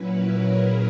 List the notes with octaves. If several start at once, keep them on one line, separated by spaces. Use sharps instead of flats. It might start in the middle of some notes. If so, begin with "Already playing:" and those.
Already playing: A#2 F#3 C#4 E4 B4
A#4
G#4